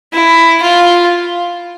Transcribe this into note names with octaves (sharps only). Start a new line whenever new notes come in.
E4
F4